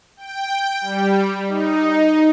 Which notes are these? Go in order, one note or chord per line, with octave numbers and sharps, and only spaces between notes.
G5
G3
D#4